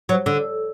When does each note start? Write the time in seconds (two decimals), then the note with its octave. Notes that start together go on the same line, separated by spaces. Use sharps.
0.09 F#3
0.26 D3